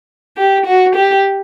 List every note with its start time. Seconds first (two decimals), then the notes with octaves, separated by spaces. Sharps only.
0.37 G4
0.66 F#4
0.95 G4